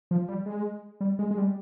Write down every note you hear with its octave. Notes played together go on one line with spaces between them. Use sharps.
F3
G3
G#3
G3
G#3
G#3
G3